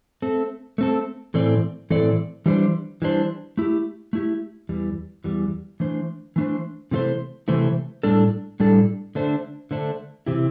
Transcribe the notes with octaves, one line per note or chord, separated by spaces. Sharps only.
A3 C4 A4
A3 C4 A4
A2 E3 C4 A4 D5
A2 E3 C4 A4 D5
E3 G3 D4 C5
E3 G3 D4 C5
A3 E4 G4
A3 E4 G4
E2 E3 G3
E2 E3 G3
E3 A3 D4 C5
E3 A3 D4 C5
C3 E3 A3 E4 C5
C3 E3 A3 E4 C5
A2 G3 D4 A4
A2 G3 D4 A4
D3 A3 D4 C5
D3 A3 D4 C5
C3 E3 C4 E4 G4